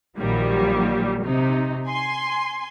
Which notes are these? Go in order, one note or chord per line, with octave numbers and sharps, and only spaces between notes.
A#1 A#2 D#3 F#3 G3
C3 D#4
G#5 C6